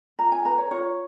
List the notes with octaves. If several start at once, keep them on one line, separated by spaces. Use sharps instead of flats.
F4 A#5
G#5
B4 A#5
C#5
F4 C#5